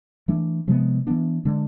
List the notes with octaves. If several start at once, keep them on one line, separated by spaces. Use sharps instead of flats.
E3 A3 D4
C3 F3 G#3 B3
E3 B3 D4
D3 G#3 D4